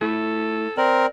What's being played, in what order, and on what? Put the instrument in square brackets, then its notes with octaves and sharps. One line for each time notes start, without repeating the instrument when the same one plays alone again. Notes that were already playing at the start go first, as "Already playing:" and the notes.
[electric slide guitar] A3 E4 [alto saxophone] A4
[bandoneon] C4 A#4 [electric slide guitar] D5